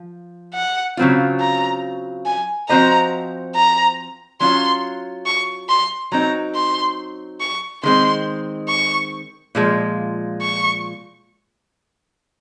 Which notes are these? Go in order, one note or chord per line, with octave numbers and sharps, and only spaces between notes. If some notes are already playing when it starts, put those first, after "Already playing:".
Already playing: F3
F#5
C#3 F#3 C4 F4
A#5
G#5
F3 C4 F#4 C5 D#5 A#5
A#5
F#3 C#4 F4 C6
C#6
C6
F#3 C4 D#4 A#5
C6
C#6
D#3 G#3 C4 C6
C#6
A#2 F3 G#3
C#6